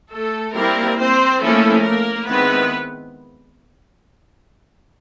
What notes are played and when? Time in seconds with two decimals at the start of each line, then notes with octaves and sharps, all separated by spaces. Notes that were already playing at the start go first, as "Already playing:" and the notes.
0.11 A3 A4
0.55 G3 A#3 C4 E4 A#4
0.98 C4 C5
1.41 F3 A3 A#3 C#4 E4 A4
1.85 A#3 A#4
2.28 D#3 G#3 B3 C4 E4 B4